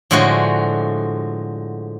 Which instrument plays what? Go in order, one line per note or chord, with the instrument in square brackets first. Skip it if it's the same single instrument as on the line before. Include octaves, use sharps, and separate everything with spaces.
[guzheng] A2 D3 F3 G#3 F#4